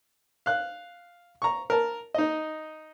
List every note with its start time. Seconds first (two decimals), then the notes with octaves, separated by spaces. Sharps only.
0.46 F5 F#6
1.42 A#5 C#6
1.70 A#4 A5
2.14 D#4 D#5